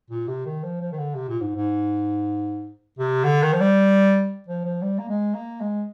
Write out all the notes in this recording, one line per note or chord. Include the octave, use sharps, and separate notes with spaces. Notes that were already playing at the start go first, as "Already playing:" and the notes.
A#2
C3
D#3
F3
F3
D#3
D3
C3
A#2
G#2
G#2
C3
D3
D#3
F3
G3
F3
F3
G3
A#3
G#3
A#3
G#3